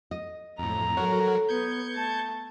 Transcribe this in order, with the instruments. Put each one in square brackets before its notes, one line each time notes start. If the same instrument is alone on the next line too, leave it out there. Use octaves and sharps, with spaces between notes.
[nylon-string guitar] D#5
[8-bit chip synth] F2 A2 [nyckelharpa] A#5
[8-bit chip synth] F#3 F#4 A#4 [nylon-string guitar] A4 C#5
[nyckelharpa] B3 [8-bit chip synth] G6 G#6 C#7
[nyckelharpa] A3 A5